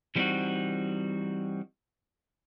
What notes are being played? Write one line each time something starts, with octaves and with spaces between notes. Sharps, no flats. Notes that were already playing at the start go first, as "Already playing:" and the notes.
E3 G3 B3 C4 D#4 F#4